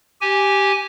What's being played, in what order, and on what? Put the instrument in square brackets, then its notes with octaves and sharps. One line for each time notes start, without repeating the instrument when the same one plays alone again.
[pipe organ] G4 G#5